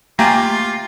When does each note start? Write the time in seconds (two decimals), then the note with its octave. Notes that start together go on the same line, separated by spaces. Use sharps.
0.19 A3 A#3 F4 G4 G#5 A#5